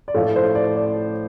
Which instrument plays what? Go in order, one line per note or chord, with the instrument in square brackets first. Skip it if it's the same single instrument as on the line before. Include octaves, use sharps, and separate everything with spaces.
[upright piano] D5
A2 F3 A3 C#5
C5
D5
D5